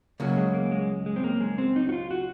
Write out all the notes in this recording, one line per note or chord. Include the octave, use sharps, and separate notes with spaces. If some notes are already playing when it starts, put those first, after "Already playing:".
C#2 C#3 F#3 A#3
G#3
A#3
G#3
G#3
C4
A#3
G#3
C4
D#4
F#4
F4
F#4